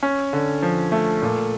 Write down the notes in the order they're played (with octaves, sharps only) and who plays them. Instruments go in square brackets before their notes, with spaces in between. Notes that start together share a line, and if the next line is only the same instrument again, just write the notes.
[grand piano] C#4
D3
F3
A3
A#2